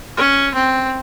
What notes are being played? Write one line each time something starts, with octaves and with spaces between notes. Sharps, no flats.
C#4
C4